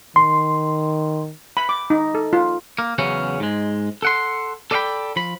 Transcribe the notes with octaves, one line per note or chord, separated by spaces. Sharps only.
D#3 C6
B5
D6
D#4
A4
F4
A#3
E2 C#3 E3 F#3 C#4
G#2 G#3
A4 F#5 C6
A4 D5 D#5 F5 G5 B5
F3 B5